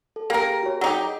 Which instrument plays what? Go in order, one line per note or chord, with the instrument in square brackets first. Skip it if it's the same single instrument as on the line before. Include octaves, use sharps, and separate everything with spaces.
[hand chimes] A4
[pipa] A#3 A#4 [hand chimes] G4 G#4 G5
[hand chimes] F#4 G#4 C#5
[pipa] F#3 D#4 G4